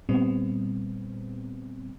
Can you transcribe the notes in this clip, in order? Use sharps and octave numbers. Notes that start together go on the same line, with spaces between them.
A#2 G3 B3 C4